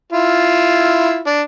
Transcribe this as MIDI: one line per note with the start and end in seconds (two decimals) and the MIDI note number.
0.13 1.20 64
0.13 1.20 65
1.27 1.41 62